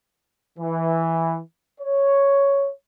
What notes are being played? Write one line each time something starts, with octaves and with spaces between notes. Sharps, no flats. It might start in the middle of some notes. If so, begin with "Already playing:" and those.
E3
C#5